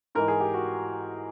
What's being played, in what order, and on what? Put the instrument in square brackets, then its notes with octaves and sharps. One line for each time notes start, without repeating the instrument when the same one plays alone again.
[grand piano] G#2 E3 G#3 A#4
G#4
G4
F#4